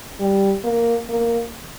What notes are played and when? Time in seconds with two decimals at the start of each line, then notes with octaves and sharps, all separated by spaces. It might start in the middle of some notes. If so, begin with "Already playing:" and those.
0.20 G3
0.64 A#3
1.09 A#3